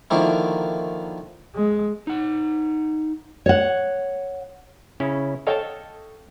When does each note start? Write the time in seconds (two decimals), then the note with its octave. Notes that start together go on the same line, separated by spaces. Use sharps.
0.11 D3 D#3 F3 A#3 E4
1.55 G#3
2.07 D#4 F#5
3.46 C#5 F#5
5.00 C#3 C#4 E4
5.47 A4 C#5 D#5 F5 G5 A5